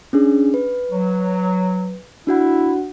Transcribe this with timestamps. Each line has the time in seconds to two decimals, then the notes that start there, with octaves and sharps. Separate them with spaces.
0.13 C#4 D4 G#4
0.54 B4
0.92 F#3
2.27 D4 E4 F#4 F#5